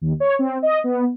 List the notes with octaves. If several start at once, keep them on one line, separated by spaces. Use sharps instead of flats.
D#2
C#5
C4
D#5
B3